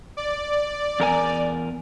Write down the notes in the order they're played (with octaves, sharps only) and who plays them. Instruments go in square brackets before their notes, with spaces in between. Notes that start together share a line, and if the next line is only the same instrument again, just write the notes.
[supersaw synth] D5
[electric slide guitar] E2 A#4 G#5